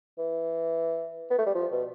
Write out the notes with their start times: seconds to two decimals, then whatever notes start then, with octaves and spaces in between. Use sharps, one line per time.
0.19 E3
1.31 B3
1.39 A3
1.46 G3
1.55 F3
1.72 B2